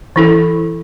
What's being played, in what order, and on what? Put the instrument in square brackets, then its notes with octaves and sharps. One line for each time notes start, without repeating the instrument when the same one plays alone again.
[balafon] E3 E4 A4